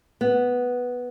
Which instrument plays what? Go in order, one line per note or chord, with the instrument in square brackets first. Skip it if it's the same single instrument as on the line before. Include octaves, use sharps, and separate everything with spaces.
[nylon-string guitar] B3